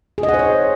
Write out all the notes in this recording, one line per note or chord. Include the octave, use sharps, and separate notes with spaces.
G#4
D#5
F#5
C5
C#5